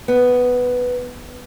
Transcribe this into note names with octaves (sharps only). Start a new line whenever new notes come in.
B3